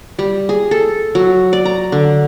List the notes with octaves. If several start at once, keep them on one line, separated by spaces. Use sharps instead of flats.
G3
G#4
A4
F#3
D5
A#5
D3